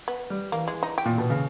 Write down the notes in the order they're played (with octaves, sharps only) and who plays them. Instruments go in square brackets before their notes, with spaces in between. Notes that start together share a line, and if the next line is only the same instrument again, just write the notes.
[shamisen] B3
[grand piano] G3
[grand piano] E3 [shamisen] A#3
[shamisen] G#3
D#4
G4
[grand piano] A#2
B2
C#3